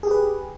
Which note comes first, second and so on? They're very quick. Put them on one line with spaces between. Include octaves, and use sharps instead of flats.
G#4 G4 B4